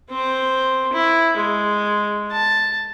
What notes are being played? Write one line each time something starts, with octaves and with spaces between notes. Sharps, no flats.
C4 C5
E4
G#3
A5